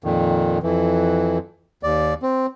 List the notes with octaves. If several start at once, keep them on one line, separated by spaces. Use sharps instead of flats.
F2 A#2 D#3
F2 E3
D#2 D5
C4